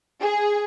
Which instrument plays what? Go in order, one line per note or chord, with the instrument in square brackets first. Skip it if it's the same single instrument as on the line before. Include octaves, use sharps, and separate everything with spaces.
[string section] G#4